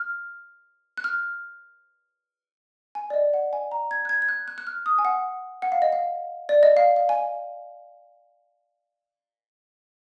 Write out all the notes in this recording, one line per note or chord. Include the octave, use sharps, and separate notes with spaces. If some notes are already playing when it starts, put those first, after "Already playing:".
Already playing: F6
F#6
F6
G#5
D5
D#5
F#5
G#5
A#5
G#6
F#6
G#6
G#6
F#6
F#6
F#6
F6
D#6
G#5
F#5
F#5
F5
D#5
F5
D5
D#5
F5
F5
G#5